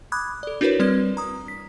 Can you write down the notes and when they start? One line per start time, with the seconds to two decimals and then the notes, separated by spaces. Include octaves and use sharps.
0.12 B5 D6 D#6 F#6 G#6
0.43 A4 D5
0.61 D4 E4 F#4 A#4 B4 C#5
0.80 G3 C4 B4 D5 G#6
1.17 A#5 D#6
1.48 B6